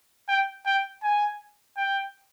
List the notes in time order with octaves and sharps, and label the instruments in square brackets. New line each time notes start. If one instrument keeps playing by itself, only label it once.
[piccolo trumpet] G5
G5
G#5
G5